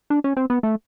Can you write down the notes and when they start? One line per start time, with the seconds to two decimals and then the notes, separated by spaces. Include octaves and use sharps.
0.10 D4
0.24 C#4
0.37 C4
0.50 B3
0.63 A3